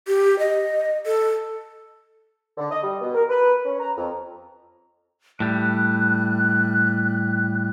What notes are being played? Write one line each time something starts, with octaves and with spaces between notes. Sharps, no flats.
G4
D#5
A4
D3
D#5
G3
B2
A#4
B4
C#4
A#5
F2
A2 G3 F#6